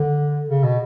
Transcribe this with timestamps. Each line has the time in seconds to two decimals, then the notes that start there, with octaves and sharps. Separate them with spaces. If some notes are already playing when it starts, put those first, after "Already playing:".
Already playing: D3
0.49 C#3
0.63 B2